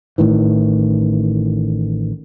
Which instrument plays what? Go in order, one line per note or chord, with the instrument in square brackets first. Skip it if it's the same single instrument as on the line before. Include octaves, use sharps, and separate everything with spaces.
[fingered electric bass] A1 A2 D#3 E3